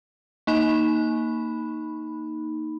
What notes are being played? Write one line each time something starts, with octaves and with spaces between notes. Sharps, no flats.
A#3 D#4 B5